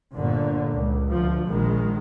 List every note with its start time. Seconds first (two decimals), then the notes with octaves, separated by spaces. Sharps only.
0.13 G1 A#2 D3
0.73 C#2
1.10 D2 F3
1.48 A#1 D#3 G#3